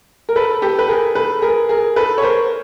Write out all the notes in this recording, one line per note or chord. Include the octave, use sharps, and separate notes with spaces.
A#4
A4 B4
G4 A4
B4
G#4 A#4
A4 B4
G#4 A#4
G#4 A#4
A4 B4
C#5
A#4 C5